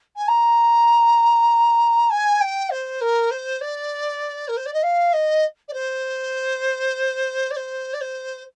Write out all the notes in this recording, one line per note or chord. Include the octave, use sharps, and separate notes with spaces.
G#5
A#5
G#5
G5
C5
A#4
C5
D5
A#4
C5
D5
D#5
F5
D#5
D5
C5
D5
C5
D5
C5